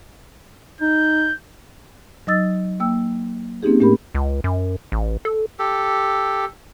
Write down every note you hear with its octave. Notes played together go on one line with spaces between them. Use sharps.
D#4 G6
F#3 D#4 D#5 D#6 E6 A6
A#3 G5 E6
A#3 C4 C#4 D#4 G4 G#4
A2 A3 C#4 G4 A#4 B5
C#2
F#2
A1
A4
G4 A4